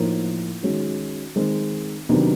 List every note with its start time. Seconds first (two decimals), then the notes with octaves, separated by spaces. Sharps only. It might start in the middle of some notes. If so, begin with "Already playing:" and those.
Already playing: A2 F3 A#3 D#4
0.63 D#3 G#3 C#4 F#4
1.36 D#3 G#3 C4
2.09 C3 D#3 F#3 B3 D4